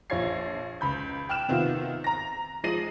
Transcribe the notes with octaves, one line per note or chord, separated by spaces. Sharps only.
A#1 F3 C#5 F5 G#6 C7
C#2 B5 G6
G5 F6 F#6 E7
C3 D#3 B3 F4
A#5 A#6
F3 G#3 A#6 C7 D#7 F#7